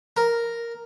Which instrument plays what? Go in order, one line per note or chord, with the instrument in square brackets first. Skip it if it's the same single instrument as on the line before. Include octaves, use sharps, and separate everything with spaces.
[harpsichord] A#4